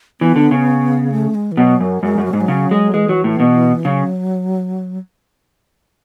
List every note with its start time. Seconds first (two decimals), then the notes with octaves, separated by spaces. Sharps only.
0.21 E3 B3
0.36 D3
0.51 C#3
1.12 A3
1.35 G#3
1.52 E3
1.57 B2 F#3
1.80 F#2
2.03 F#2 G#3
2.18 F#2
2.25 F#3
2.33 G#2 G#3
2.41 F#3
2.48 C#3
2.71 G#3
2.94 E3 G#3
3.09 F#3
3.24 A2
3.40 B2
3.85 C#3 F#3